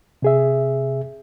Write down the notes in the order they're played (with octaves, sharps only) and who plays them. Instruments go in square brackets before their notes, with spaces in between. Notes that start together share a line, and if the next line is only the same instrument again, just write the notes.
[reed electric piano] C3 G#4 E5